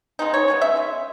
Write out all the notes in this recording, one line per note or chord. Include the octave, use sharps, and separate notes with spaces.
C#3 G#3 B3 D#4
C#5
C#3 G#3 B3
E5
C#3 G#3